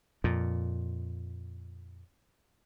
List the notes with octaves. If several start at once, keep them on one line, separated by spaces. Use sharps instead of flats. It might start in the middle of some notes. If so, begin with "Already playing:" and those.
F2 A#2